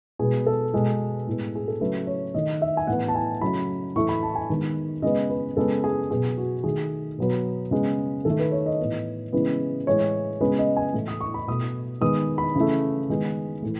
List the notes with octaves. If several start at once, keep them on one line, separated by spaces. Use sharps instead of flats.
B2 G#3 B3 G#4
A4
B2 G#3 B3
A2 G#3 B3
G#4
A4
C#3 F#3 A3 B4
C#5
D#3 A3 D#5
E5
G#5
A2 E3 B3 F#5
A5
G#5
C#3 F#3 A3 B5
A2 E3 A3 C#6
B5
A5
G#5
D#3 G#3 B3
C#3 G#3 B3 D#5
B4
C#3 G#3 B3 A4
G#4
B2 F#3 B3 G#4
F#4
D#3 A3 G#4
B2 F#3 B3
C#3 G#3 B3
D#3 A3 A4
B4
C#5
D#5
A2 E3 B3
C#3 E3 G#3 B3
A2 E3 G#3 C#5
C#3 G#3 B3 B4
D#5
G#5
A2 E3 A3
D#6
C#6
B5
B2 A3 D#6
D#3 G#3 B3 D#6
B5
C#3 E3 A3
D#3 G#3 B3
A2 E3 A3